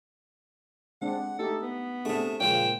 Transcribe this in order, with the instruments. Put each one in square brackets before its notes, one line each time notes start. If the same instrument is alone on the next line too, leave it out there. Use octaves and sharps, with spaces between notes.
[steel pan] G#3 C4 D4 [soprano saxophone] F#5
[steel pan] A3 D#4 G4 [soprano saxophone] A4
[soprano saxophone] B3
[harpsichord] C3 A3 [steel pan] D4 G#4 A4
[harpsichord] A#2 C#3 F3 [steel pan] G#3 F4 C#5 [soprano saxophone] G5